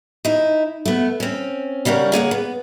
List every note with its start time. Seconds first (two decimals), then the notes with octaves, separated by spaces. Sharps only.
0.25 D#4 E4
0.85 A3 B3
1.20 C4 C#4
1.85 C#3 G3 C#4 A#4 F#5
2.12 A#3 G#4 C#5 F#5
2.31 B3